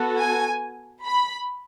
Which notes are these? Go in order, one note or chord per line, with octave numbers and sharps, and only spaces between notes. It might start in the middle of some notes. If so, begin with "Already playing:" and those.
Already playing: B3 F#4 A4
G#5
B5